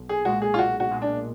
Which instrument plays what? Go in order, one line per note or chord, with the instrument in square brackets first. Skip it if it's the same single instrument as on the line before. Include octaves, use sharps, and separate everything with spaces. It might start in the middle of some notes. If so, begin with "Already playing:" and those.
Already playing: [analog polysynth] B1
[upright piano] G#4
[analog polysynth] A#2 G#3 [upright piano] F#4
[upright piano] G#4
F4
[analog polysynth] B1 [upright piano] F#4
[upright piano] F#4
[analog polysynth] A#2 G#3
[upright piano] D4